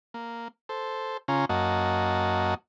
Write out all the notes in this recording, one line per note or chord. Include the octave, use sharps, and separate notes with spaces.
A#3
A4 C5
C#3 C#4 F4 A#5
F#2 A#3 F#4 D#5 A5